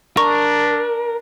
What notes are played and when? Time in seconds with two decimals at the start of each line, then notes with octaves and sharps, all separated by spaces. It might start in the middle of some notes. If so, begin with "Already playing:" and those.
0.17 D4 A#4 C#6